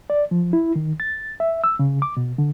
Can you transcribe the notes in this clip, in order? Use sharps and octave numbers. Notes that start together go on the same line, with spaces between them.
D5
F3
E4
D#3
A6
E5
E6
C#3
D6
B2
D3